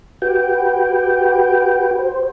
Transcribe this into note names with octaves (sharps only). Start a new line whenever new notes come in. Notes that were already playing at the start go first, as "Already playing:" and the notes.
F#4 G4 B4 G5
C5